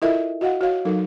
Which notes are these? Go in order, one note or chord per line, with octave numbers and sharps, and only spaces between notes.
E4 F4 A4 A#4 D#5 E5
F#4 D#5 F5 F#5
F#4 C#5 F5
F#3 D#4 A4 A#4